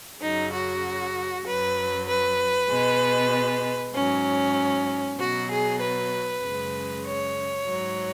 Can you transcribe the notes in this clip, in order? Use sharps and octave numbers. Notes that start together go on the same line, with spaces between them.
F#2 C#3 F#3 D#4
F#4
F#2 F#3 B4
B4
B2 G#3
G#2 F#3 C#4
B2 F#3 F#4
G#4
B4
F#2 C#3 G#3
C#5
G#2 F#3